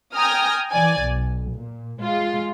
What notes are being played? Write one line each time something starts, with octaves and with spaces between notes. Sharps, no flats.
G5 G#5 A#5 D#6 F6
E3 D5 G#5
B1
A#2
G#3 F4